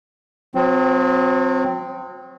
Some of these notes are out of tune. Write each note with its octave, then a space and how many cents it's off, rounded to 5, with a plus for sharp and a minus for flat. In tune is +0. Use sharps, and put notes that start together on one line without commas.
F#3 -40 C4 -10